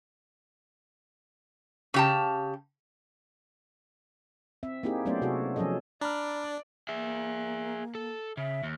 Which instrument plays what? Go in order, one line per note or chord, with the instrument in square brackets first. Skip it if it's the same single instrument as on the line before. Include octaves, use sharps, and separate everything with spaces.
[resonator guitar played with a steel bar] C#3 G4 A5
[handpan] C4 E5
A#3 C4 D#4 E4 G4 G#4
F#3 A3 B3 C#4 C5 D5
C3 F#4 G#4 A4
F3 F#3 C#4 G#4 A4 D#5
[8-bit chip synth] D4 [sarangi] D5 [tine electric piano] A#5 B5 F6
[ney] A#3 [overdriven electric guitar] G#4 E5
[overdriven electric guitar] A4
[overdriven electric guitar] C#3 [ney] E5
[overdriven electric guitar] D#2